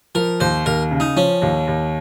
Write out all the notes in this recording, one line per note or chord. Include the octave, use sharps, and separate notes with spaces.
F3 A#4
D#2 C5
D#2 A#4
C#3
D#4
F3 C#4
D#2
D#2